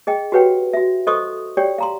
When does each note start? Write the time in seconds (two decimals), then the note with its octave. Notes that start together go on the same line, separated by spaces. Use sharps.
0.07 G#4 D#5 G5
0.32 F#4 G4 B4 C#5 F#5 G5
0.73 F#4 E5
1.07 A4 C5 D#5 C6 C#6 D#6
1.57 G4 C#5 D5 G5
1.78 F5 A#5 C6